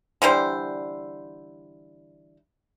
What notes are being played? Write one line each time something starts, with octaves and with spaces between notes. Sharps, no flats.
D3 E3 G3 C5